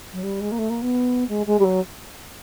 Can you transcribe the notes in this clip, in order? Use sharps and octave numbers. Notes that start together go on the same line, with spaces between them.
F#3
G3
G#3
A#3
A3
A#3
B3
G#3
G#3
G3
F#3